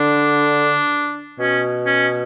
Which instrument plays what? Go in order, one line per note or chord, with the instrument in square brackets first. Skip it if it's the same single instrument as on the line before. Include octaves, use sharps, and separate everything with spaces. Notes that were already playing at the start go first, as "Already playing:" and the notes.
Already playing: [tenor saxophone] D3 [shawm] D4
[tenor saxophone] B2 [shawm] C#4
[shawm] C#4